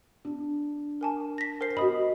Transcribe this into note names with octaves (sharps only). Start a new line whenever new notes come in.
D4
A#4 G#5 A5
A#6 B6
A#4 C5 C7
F#4 D#5 B5 D#6